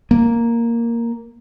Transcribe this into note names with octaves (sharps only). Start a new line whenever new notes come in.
A#3